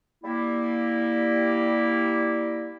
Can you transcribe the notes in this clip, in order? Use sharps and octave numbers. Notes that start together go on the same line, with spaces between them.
G3 A#3 E4